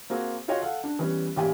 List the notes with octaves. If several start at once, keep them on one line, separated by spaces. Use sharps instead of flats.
A#3 C4 F#4 G#4
F4 F#4 G#4 C#5 D#5 G5
A4 F5 F#5
D4
E3 G3 B3 C#4
A1 A#2 G4 G5 G#5